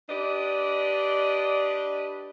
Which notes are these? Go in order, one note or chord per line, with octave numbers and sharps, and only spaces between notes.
D4 G4 B4 D5 D#5